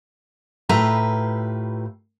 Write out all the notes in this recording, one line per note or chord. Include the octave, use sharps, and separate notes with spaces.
A2 F4 G4 B4 E5 A#5